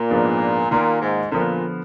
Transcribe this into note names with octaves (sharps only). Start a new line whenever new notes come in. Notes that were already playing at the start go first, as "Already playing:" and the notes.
Already playing: A#2
G#2 F3 G#3 B3 D4
A#2 D#3 A#3 F4 A#4
G#2
A#2 D3 F3 B3